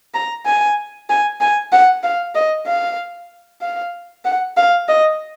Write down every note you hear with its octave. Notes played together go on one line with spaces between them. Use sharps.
A#5
G#5
G#5
G#5
F#5
F5
D#5
F5
F5
F#5
F5
D#5